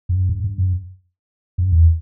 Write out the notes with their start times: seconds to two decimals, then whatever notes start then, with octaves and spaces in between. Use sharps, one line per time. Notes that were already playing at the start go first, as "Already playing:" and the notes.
0.09 F#2
0.29 G2
0.44 G2
0.58 F#2
1.58 F#2
1.72 E2